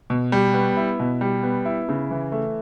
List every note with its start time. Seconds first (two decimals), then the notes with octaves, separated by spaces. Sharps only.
0.10 B2
0.32 G3
0.54 B3
0.77 E4
1.00 B2
1.21 G3
1.43 B3
1.65 E4
1.89 C#3
2.11 E3
2.32 A3